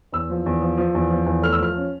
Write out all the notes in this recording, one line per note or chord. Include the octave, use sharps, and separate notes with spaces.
E2 E6
F3
E2
F3
F3
E2
F3
E2
A3 F6
E6
F3 F6
C#4